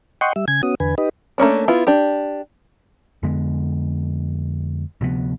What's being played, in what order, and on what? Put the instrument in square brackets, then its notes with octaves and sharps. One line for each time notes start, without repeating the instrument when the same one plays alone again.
[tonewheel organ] D#5 F#5 G5 C6 C#6
G3 E5
C#3 G#5 G#6
B3 C#4 F#4 D#6
E2 D3 B4 G#5
D#4 G4 B4 D#5
[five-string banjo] A3 A#3 C#4 D4
B3 E4 F4
D4 G4
[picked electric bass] F2 D3 G#3 B3
D2 C3 F3 B3